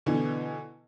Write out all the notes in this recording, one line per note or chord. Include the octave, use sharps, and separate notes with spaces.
B2 D3 E3